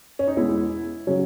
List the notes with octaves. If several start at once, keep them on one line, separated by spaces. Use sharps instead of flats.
C#4
D#4
E2 B2 G#3 E4
C#3 F#3 C#4